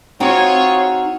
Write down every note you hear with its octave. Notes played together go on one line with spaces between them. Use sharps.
C4 D#4 F4 F#4 G#4 C#5 G5